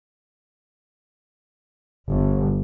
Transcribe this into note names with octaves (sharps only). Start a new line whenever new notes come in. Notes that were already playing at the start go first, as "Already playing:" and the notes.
G1